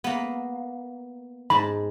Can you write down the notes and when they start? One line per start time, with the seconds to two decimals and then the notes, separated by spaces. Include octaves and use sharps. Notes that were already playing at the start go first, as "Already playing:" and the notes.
0.04 A#3 B3
1.50 G#2 A5 B5